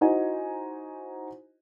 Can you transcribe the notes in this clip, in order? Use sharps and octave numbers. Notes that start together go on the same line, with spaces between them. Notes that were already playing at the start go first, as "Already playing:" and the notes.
D#4 E4 F#4 C5 D#5 G#5